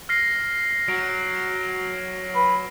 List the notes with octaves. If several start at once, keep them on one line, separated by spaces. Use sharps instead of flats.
F6 A#6 C7
F#3 D7
B4